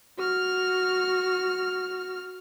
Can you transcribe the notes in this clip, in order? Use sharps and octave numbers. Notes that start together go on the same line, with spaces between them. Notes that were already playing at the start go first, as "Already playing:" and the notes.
F#4 F6